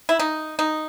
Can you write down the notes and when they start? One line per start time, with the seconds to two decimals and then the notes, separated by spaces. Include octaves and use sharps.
0.09 E4
0.19 D#4
0.59 D#4